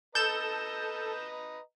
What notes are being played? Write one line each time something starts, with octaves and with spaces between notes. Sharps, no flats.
A4 B4 D#5 A#5 G6 E7